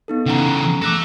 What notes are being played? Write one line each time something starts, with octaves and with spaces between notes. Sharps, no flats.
B3 D#4 A4
C#3 E3 C#4 F#5 A#5
A4 E5 D6 F#6 A#6